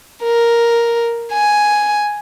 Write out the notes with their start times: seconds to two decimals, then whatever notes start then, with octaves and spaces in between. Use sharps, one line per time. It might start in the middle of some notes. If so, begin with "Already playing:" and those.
0.23 A#4
1.33 G#5